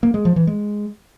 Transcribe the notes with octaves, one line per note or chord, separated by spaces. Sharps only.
A#3
G#3
F3
E3
G#3